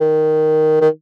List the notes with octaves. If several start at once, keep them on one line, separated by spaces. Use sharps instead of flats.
D#3
D#3